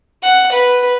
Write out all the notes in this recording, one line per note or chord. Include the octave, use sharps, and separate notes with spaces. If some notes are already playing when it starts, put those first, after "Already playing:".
F#5
B4